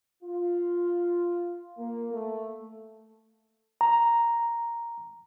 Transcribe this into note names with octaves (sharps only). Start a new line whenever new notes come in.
F4
A#3
A3
A#5